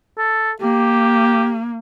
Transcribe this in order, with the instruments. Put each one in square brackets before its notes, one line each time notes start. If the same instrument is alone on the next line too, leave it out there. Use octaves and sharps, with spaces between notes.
[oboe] A4
[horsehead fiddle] A#3 [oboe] G4